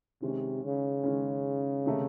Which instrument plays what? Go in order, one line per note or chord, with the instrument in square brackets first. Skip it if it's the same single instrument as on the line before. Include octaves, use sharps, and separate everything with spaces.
[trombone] C3 [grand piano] D#3 G#3 C#4
[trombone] C#3
[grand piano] D#3 G#3 C#4
C3 D#3 A3 D#4